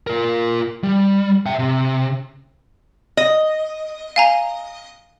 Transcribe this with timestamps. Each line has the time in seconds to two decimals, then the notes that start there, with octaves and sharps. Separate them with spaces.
0.07 F4 A#4
0.83 G3
1.46 E5 G5
1.59 C3
3.17 D#5
4.16 F5 G#5 A#5